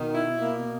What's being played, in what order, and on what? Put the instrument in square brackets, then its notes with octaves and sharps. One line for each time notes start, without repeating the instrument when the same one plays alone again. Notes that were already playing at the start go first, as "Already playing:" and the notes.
Already playing: [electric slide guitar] B2 [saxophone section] D#3
[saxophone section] E4
A#3